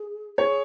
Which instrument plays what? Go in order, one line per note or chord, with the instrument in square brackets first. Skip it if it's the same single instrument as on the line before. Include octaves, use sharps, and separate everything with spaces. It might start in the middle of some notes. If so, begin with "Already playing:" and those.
Already playing: [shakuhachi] G#4
[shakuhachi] G#4 [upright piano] C#5